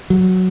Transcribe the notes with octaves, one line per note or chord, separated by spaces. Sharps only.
F#3